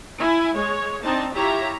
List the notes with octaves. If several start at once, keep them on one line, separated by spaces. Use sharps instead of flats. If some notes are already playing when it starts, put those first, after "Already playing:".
E4 G#5
G#3 C#5
C4 D4 D#4 A5
E4 F4 G4 C#5 E5 A#5